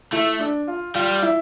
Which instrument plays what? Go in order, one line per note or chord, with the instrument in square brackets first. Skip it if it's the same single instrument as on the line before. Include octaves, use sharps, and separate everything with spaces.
[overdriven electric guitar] A3 [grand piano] E4
[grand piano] D4
F4
[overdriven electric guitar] G3 [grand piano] F4
[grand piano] E4